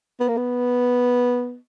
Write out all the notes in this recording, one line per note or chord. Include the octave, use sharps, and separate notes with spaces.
B3
A#3
B3